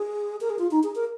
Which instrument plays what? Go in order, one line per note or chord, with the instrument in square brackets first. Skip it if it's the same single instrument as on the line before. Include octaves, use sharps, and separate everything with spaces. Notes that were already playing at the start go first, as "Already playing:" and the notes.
Already playing: [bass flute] G#4
A#4
G#4
F4
D#4
G#4
A#4